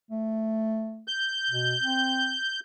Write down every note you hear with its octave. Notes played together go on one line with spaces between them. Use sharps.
A3
G6
B2
C4